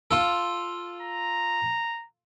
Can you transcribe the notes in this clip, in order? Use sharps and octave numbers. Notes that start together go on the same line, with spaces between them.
F4 A4
A#5